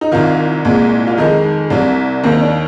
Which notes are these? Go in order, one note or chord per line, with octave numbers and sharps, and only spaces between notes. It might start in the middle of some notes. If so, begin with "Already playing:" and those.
D#4
C2 C3 D#3 F4
C2 A#2 G#3
F4
F2 D#3 G#3 D#4
C2 C3 G3 D4
D#2 D#3 A#3 C4
D4